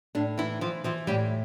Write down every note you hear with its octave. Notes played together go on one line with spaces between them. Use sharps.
A2 D4
E3 E4
E3 F3
E3 F3
A2 G3